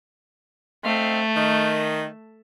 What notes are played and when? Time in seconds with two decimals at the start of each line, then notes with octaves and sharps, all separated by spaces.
0.85 A3 C4 D#4 F5
1.35 D#3